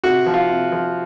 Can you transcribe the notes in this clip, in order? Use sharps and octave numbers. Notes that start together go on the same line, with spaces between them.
C3 F#4
F3
F4
C3
F3